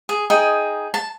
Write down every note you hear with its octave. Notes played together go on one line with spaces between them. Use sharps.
G#4
D#4 G#4 G5
A5